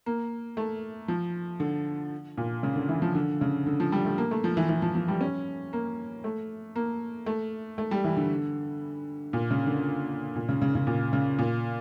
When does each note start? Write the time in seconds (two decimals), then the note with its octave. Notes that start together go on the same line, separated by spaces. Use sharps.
0.06 A#3
0.57 A3
1.08 F3
1.60 D3
2.38 A#2
2.63 C#3
2.76 D3
2.89 E3
3.02 F3
3.15 D3
3.41 C#3
3.66 D3
3.80 F3
3.92 G3
4.05 A3
4.18 A#3
4.31 A3
4.44 F3
4.57 E3
4.69 E3
4.82 F3
4.95 F3
5.08 G3
5.21 C#4
5.73 A#3
6.24 A3
6.76 A#3
7.26 A3
7.78 A3
7.91 G3
8.04 E3
8.17 D3
9.33 A#2
9.51 C#3
9.67 D3
10.36 A#2
10.49 C#3
10.62 C#3
10.75 C#3
10.87 A#2
11.13 C#3
11.39 A#2